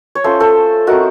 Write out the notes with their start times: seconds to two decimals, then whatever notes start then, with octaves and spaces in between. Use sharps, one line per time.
0.15 C#5
0.24 A3 C#4 F4 A4 C5
0.40 A4 C5
0.87 A3 C4 D#4 F#4 A#4